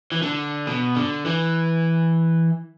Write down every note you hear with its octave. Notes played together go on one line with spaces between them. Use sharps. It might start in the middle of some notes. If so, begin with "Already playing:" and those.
E3
D3
B2
D3
E3